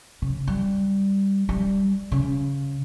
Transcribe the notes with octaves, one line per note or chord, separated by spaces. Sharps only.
C#3
G3
G3
C#3